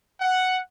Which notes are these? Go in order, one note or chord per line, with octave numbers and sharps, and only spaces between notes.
F#5